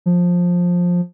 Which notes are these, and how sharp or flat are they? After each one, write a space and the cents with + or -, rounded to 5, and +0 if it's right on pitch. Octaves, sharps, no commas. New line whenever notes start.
F3 +15